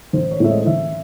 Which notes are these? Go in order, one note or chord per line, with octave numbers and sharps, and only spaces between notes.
A1 C5
C#5
A2 E3 G#3 C4 E5
D#5
A1 E5